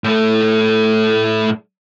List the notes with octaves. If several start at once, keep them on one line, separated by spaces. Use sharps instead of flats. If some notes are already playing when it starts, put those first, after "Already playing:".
A2 A3